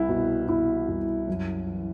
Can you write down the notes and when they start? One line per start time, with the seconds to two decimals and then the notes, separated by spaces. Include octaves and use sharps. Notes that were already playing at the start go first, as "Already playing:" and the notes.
Already playing: C2 E4
0.09 B2
0.48 B2 E4
0.88 C2
1.27 F#2
1.67 E3